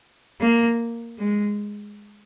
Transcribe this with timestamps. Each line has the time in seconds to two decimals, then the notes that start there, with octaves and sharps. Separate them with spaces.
0.41 A#3
1.18 G#3